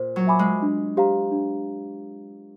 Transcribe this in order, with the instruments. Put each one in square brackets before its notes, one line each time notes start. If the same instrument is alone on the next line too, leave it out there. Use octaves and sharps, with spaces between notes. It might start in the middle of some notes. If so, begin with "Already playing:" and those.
Already playing: [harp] A#2 [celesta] C5
[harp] F#3
[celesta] E5 G#5 B5 D6
[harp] G#3
[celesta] D4
G4 C5 F5 A#5
D4